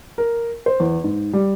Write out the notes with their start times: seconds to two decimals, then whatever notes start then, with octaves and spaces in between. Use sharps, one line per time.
0.18 A#4
0.66 C5
0.80 E2
1.04 G#2
1.33 G3